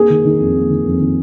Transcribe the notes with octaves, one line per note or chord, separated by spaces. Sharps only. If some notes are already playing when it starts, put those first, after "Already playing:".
Already playing: A#3 G#4
D#3
D#3
F2
A#3
D#3
F2
D#3